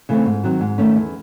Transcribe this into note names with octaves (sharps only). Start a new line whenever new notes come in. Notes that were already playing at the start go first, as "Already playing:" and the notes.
C#3 E3 A3 C4
G#2
D#3 F#3 C4 F#4
G#2
D#3 A3 C#4
E2